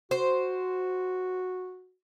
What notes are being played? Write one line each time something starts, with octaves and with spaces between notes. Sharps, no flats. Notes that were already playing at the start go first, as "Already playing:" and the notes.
F#4 C5